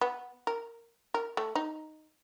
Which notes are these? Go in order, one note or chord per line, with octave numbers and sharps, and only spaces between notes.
B3
A#4
A#4
A3
D#4